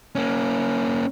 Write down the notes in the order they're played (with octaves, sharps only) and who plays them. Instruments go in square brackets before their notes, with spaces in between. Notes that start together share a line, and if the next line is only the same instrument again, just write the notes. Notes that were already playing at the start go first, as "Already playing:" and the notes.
[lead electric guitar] A#3 C#4